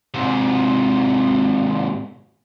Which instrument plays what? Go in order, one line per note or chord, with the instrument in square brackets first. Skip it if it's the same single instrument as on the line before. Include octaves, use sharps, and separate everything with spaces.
[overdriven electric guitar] G#2 C3